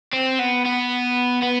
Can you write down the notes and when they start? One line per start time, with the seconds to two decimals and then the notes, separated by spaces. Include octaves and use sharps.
0.13 C4
0.40 B3
0.66 B3
1.43 B3